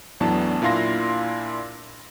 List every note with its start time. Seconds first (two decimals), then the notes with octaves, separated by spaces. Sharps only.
0.21 E2 A2 F#3 B3 D4 A5
0.62 A#2 D4 E4 F5 C6 A#6